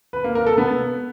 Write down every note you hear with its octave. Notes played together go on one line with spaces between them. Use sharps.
B4
A#3
A#4
A4
B3